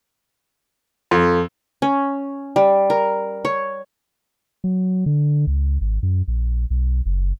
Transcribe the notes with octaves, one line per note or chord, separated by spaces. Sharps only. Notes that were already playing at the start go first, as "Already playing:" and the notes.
F2 A4
C#4
G3
A#4
C#5
F#3
D3
C#2
G#1
F#2
A#1
B1
F#1